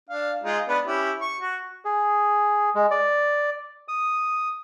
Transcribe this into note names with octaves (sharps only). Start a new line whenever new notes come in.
D4 F5
G#3 D#4 F4
B3 D4 B4
C#4 E4 G4
C#6
F#4
G#4
G#3
D5
D#6